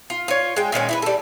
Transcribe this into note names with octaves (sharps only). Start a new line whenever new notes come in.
F4
F4 C#5
G#3 G5
A#2 D#3 G#3 C#4
E4 G#4 B4
G3 A4